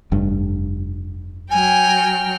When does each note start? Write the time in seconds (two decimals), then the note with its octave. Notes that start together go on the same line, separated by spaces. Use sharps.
0.12 F1 G2
1.51 F#3 G5 G#5 F6